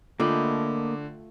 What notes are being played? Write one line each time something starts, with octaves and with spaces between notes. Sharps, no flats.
D3 A3 A#3 F4 D#5 G5 B5 D6